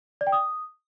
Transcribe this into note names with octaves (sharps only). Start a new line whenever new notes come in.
D5
G5
D#6